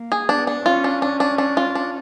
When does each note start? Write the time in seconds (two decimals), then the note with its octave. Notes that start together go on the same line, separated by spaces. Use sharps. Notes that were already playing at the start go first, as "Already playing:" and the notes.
Already playing: A#3
0.12 G#4
0.29 B3 D4
0.47 D4
0.65 C#4 F4
0.84 D4
1.02 D4
1.20 D4
1.38 D4
1.57 F4
1.75 D4